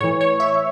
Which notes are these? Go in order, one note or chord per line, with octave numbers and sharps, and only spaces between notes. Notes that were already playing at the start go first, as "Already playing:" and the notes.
A2 E3 C#5
C#5
E5